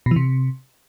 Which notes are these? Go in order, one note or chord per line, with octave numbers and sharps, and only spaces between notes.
B2
E3
C3